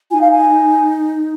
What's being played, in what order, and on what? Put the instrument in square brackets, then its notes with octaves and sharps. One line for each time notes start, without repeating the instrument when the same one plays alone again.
[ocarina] D#4 F4 [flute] G#5
[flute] F5
G#5